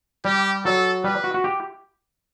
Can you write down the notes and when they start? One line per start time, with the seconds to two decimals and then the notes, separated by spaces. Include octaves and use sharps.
0.25 G3 G4
0.65 F#3 A4
1.04 G3 B4
1.24 F#4
1.34 F#4
1.44 G4